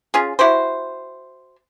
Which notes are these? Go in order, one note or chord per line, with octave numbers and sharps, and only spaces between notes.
C#4 F4 G#4
E4 F#4 G4 C5